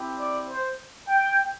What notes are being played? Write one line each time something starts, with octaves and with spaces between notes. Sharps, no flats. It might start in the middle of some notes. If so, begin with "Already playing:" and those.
Already playing: C4 E4 G4
D5
C5
G5